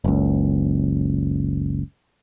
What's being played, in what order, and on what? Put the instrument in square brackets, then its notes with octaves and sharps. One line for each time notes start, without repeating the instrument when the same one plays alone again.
[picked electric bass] F#1 C#2